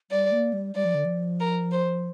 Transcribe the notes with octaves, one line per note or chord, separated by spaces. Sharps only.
G3 D5
A#3
G3
G3 D5
F3
D3
F3
A#4
C5